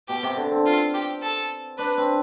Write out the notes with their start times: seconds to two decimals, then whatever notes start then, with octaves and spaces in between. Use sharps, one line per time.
0.08 B2 G4
0.23 C3
0.37 D3
0.51 C4
0.66 F4
0.94 G4
1.22 A4
1.78 D4 B4
1.97 C4